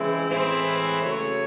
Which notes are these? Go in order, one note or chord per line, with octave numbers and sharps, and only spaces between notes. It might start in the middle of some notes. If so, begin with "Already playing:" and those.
Already playing: C#3 E3 G#3 C4 E4
A2 E3 G#3 C4 E4 C5
B4
C#3 F#3 A3 C#5